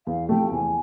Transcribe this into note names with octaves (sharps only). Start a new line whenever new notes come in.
E2 F5
C3 F3 A3 G5
E2 G#5